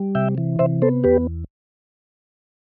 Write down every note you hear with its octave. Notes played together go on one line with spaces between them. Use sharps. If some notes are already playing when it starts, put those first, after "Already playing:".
Already playing: G3
C3 E5 G5
E3
C3 C5 E5
B3 A4 C5
E2 G4 B4